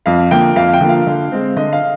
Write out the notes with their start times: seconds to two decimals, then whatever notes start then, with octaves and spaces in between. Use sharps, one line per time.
0.06 F2 F5
0.31 D3 F3 A#3 G5
0.55 F2 F5
0.73 G5
0.81 D3 F3 A#3
0.89 F5
1.07 D3
1.32 G#3 C4
1.56 D3 D#5
1.73 F5